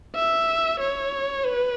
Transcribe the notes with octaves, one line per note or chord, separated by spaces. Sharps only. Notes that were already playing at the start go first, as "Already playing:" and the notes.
E5
C#5
B4